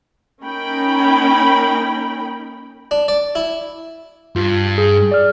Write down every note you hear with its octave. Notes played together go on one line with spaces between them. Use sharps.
A#3 C#4 D#4 A#4 G5 B5
D4
D5
E4
G2 F4
G#4
D5 F6